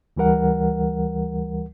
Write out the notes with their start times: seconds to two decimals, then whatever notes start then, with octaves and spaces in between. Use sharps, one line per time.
0.17 D2 E3 G3 A#4 F#5